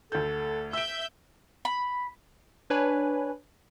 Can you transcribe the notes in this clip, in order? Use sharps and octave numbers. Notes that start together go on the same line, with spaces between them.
D2 A4 G6
E5 E6 G6 D7
B5
D4 B4 C#5 G#5 B5